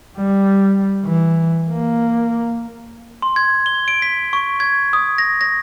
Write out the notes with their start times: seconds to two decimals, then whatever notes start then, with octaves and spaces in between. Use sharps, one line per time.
0.17 G3
1.05 E3
1.70 A#3
3.22 C6
3.36 G#6
3.66 G7
3.88 D7
4.02 B6
4.33 C#6
4.60 G#6
4.93 D#6
5.18 A#6
5.41 A#6